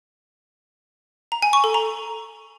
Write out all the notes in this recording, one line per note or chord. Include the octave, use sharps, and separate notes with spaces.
A#5
G#5
C#6
A4
A#5